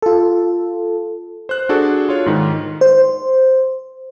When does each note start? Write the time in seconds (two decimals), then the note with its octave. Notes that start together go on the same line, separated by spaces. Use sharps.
0.02 F4 A4
1.49 C5 F#6
1.69 D4 F#4 G#4 A4
2.09 F4 C#5
2.26 G#2 D#3
2.81 C5